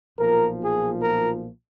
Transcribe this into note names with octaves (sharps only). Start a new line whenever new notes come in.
B1 A#2 F3 A#4
G#4
A#4